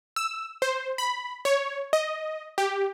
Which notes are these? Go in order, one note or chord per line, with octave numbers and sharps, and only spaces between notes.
E6
C5
B5
C#5
D#5
G4